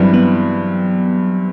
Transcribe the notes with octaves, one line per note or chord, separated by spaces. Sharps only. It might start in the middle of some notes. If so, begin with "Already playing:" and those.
Already playing: G2 E3 F#3 G3 C4
B3